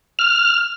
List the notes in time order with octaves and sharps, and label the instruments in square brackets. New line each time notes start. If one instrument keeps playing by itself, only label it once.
[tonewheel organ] F6